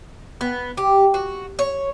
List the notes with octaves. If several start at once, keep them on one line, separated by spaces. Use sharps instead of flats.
B3
G4
F#4
C#5